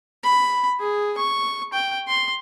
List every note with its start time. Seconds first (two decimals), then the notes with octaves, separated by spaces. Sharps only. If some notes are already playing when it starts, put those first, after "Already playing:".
0.24 B5
0.80 G#4
1.18 C#6
1.73 G5
2.08 C6